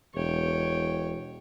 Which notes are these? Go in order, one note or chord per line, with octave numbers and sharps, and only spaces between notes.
E1 C#5 G5